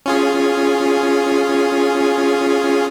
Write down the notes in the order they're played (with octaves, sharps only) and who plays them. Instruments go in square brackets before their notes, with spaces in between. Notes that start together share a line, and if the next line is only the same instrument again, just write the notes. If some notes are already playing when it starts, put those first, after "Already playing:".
[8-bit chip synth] C#4 F4 G#4